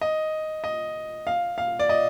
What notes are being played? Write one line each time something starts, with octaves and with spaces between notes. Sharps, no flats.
D#5
D#5
F5
F5
D5
D#5